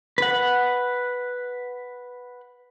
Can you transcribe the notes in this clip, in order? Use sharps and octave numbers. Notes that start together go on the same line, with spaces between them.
B4 F#5